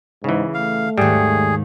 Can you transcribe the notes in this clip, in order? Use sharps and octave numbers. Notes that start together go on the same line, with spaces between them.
G#2 C#3 E3
A3 F5
D#2 G#2 G3 G#4